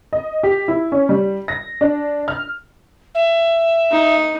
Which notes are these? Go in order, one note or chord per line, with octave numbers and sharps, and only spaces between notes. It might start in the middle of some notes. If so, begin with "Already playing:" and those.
D#5
G4
E4
C#4
G3
A#6
D4
F6
E5
D#4